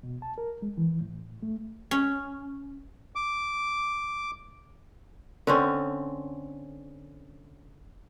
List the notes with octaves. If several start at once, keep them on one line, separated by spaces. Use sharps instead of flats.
B2
A5
A#4
G#3
E3
A2
A3
C#4
D6
D3 C4 C#4